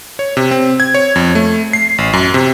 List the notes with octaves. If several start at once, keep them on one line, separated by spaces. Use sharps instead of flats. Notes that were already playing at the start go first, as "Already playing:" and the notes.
C#5
C3
C4
G#6
C#5
F2
A3
C7
A1
F#2
C3